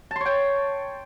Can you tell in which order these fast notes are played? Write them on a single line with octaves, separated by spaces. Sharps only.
A5 C6 C#5 G5